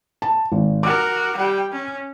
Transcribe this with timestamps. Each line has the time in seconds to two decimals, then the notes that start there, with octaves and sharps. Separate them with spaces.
0.22 A5
0.52 G#1
0.83 F#4 A#4 D6
1.36 G3 G5
1.72 C#4